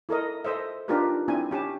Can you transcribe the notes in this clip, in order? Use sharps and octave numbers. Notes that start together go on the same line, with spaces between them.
E4 A4 A#4 D#5
A4 C5 D#5 E5
D4 D#4 F4 G4 A#4 B4
C4 D4 E4 G#5
C#4 G4 A5